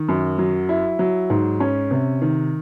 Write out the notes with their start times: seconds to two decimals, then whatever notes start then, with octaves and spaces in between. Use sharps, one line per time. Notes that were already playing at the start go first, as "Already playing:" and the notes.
Already playing: D#3
0.09 F#2
0.39 F#3
0.69 E4
0.99 F#3
1.30 G#2
1.60 C#4
1.91 C3
2.22 D#3